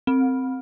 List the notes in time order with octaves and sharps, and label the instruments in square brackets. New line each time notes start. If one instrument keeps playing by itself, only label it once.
[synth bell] C4